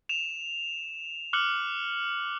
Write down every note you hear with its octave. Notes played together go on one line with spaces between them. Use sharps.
E7 F7
D6 F6 F#6 C#7 F#7